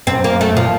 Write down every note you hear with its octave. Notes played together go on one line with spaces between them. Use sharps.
F#2 C4
A#3
A3
A#2 F3